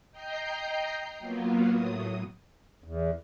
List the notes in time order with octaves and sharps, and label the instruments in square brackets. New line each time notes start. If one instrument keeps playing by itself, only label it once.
[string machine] D#5 G5 A#5 G6 C7
F#3 A#3 B3 F4
A2 F#3 D#6
[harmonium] E2